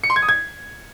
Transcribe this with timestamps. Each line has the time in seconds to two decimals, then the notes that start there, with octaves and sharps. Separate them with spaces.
0.04 C#7
0.10 C6
0.16 G#6
0.22 D#6
0.29 G#6